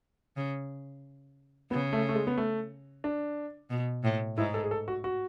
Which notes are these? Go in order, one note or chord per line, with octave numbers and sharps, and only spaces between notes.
C#3
C#3 B3
A3
A3
G#3
B3
A3
D4
B2
A2
G#2 E4
A4
G#4
A4
F#4
F#4